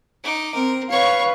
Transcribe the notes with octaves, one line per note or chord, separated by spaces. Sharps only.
D#4 D6
C4 A#4
B4 C#5 F5 C#6